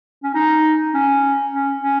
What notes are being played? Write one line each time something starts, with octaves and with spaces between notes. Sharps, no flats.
C#4
D#4
C#4
C#4
C#4